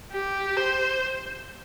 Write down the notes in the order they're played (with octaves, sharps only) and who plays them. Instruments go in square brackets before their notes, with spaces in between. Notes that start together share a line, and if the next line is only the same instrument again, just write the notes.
[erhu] G4
C5